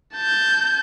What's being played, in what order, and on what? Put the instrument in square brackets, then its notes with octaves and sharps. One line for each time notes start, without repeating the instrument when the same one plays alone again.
[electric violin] A5 G6